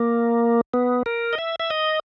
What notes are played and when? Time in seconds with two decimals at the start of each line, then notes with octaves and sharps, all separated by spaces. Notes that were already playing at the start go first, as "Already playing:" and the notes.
Already playing: A#3
0.74 B3
1.06 A#4
1.33 D#5
1.39 E5
1.60 E5
1.70 D#5